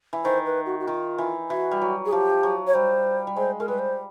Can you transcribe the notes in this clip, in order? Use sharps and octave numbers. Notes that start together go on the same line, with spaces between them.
E3
D#3 C5
B4
F#4
F#4
D#3 F4
E3
E3 F#4
G3
F#3
G#4
F3 G4
F#3
C#5
G3 C5
G3
G#3 C5
G#3 A#4
G3 B4
C5